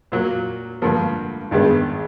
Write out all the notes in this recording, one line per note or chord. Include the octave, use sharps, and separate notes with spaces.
A#2 F#3 A#3
G2 D3 F3 A#3
G#1 G2 D#3 G#3 B3